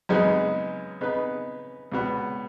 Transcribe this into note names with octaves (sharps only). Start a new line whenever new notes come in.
F#2 C#3 G#3 B3 D#4
C#3 B3 D#4 B4
C#2 B2 B3